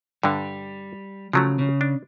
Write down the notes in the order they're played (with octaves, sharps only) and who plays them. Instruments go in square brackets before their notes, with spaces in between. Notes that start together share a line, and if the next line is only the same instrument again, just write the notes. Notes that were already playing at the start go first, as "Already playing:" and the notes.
[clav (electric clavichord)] G2 D3 [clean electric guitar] G3
[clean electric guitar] C#3 [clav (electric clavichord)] F3 F#3 A3
[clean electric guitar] C#3
[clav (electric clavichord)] D4